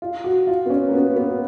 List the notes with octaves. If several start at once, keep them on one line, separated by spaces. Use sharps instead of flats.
F4
F#4
F4
B3
C#4
A#3
B3
B3